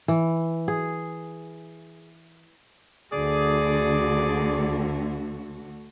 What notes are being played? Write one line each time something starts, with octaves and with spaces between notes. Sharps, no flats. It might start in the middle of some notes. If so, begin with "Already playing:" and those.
E3
G#4
D2 D3 F#4 G#4 D5